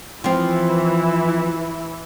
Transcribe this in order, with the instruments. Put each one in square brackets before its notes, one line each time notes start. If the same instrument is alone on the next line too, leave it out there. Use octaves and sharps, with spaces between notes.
[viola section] E3 E4 [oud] F3 C4